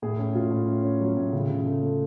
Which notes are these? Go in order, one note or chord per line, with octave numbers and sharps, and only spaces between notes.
A2 G#4
C#4
A2 F4
A2
C#4
C#4
F#3
A2
C#3
C#3
A3
A3